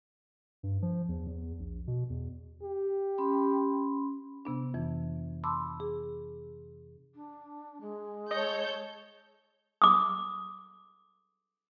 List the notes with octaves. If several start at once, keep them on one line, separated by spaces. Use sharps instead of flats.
G2
F3
E2
E2
A#1
B2
E2
G4
C#4 B5 C6
C3 B3 D4
F2 E3
A5 B5 C6 D6 E6
G#4
D4
G#3
A4 C#5 D#5 G6
D6 D#6